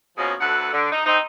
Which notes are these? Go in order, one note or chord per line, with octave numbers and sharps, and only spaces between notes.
B2 F3 A#3 C#4 G#4
D2 A4 B4 F#5
D3
D#4
C4 D#4